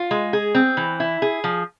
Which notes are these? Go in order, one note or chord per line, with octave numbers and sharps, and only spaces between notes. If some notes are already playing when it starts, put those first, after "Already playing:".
Already playing: F4
G#3
G#4
C4
E3
E4
G#4
F3